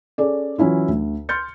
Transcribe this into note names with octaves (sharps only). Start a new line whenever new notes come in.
C#4 G#4 A4 D5
E3 F#3 C#4 E4 F4
D2
C6 F6 G6 A6 C#7